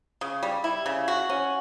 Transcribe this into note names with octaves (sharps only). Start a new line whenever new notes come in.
C#3
G3
E4
C#3
F#4
C#4